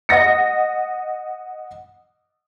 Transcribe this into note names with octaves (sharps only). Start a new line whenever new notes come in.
D#5 F#5 A#6 C#7